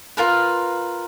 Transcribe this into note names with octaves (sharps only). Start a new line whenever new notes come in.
F4 A#4 B4